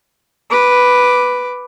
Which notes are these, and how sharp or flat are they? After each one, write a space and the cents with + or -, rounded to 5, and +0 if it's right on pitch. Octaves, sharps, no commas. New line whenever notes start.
B4 +0 D6 +5